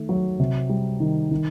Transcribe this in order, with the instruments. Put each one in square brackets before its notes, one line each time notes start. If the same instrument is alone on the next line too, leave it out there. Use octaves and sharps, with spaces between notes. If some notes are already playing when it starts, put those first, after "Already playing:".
Already playing: [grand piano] D#3 A3
F#3
C3
G3
D#3
D#3